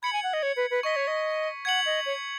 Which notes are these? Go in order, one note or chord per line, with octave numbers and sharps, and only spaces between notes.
B5 G#6 C#7 F#7
G#5
F#5
D#5
C#5
B4
B4
D#5 C#6 B6 F#7
C#5
D#5
F#5 G#6 C#7 F#7
D#5
C#5